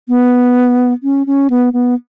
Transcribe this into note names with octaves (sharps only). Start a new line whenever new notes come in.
B3
C#4
C#4
B3
B3